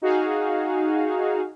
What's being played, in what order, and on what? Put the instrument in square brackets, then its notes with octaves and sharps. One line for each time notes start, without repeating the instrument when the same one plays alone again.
[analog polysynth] D#4 F#4 G#4 F5